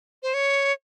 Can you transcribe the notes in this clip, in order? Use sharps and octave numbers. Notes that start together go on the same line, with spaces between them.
C5
C#5